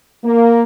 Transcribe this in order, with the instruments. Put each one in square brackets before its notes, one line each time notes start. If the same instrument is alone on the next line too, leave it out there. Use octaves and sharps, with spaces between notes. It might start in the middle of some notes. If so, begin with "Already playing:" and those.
[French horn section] A#3